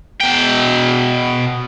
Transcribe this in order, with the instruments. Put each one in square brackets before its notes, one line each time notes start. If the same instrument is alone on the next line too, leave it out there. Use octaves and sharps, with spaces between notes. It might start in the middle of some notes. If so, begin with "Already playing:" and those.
[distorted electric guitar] B2 G5